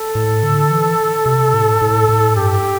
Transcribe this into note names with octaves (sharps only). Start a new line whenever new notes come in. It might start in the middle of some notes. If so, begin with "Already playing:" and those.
Already playing: A4
A2
D3
E3
C3
A2
A2
A2
G2 G4